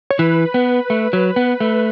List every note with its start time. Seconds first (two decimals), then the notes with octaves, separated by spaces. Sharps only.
0.10 C#5
0.19 E3 B4
0.54 B3
0.90 A3
1.13 F#3
1.36 B3
1.60 A3